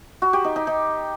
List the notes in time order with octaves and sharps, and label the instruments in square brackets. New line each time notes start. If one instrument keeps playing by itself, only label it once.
[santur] F#4
G4
D#4
D#4
D#4